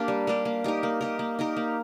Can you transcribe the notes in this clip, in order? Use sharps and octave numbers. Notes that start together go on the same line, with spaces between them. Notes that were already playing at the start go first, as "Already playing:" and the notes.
Already playing: A#3 D4 G4
G3
A#3 D4 G4
A#3
D#4 G4 A#4
A#3
D#4 G4 A#4
A#3
D#4 G4 A#4
A#3